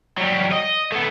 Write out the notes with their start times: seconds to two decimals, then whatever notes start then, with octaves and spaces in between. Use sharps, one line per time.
0.18 F#3 G3
0.52 D#5
0.92 A3 B3